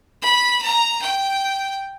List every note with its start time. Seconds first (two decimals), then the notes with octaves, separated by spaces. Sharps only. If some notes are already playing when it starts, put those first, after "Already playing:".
0.22 B5
0.62 A#5
1.02 G5